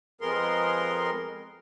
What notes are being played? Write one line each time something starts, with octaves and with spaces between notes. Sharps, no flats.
F2 G#3 B3 A#4 C6